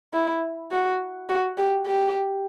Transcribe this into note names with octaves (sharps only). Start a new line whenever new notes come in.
E4
F#4
F#4
G4
G4